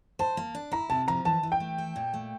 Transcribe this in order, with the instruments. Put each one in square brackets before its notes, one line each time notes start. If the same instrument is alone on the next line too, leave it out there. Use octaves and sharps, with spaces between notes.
[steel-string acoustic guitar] C5 [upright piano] A5
[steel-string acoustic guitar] A#3
D4
[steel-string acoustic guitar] E4 [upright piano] A#5
[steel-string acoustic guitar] C3 [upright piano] A5
[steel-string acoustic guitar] F3 [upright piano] A#5
[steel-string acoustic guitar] E3 [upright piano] A5
[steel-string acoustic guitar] E3
[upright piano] G5
[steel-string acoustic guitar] A3
A4
A#2
A3